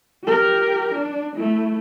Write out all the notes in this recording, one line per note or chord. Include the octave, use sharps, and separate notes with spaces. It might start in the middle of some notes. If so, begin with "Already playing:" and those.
G4 A#4
D4
A3 E4